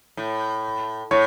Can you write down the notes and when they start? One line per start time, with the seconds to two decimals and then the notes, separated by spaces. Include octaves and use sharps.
0.17 A2
1.11 A2 C#5